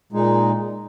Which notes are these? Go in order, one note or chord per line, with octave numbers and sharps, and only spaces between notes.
A#2 G#3 D#4